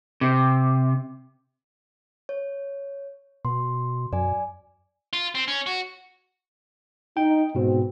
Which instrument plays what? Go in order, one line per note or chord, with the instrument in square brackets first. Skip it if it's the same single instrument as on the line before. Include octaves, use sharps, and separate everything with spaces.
[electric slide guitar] C3
[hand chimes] C#5
[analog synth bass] B2 [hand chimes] C6
[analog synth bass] F#2 [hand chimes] D5 G#5
[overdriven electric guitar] F4
C4
C#4
F#4
[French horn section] D#4 [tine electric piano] G5
[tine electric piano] G#2 B2 [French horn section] C4